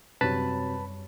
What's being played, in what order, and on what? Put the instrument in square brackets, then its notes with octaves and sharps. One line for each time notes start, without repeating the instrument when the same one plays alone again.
[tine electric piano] F#2 G3 C#5 [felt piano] C3 F#3 [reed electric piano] B4 A5 B5